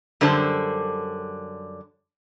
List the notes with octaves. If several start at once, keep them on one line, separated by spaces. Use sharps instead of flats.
F#2 D3 G3 D4 C5 A5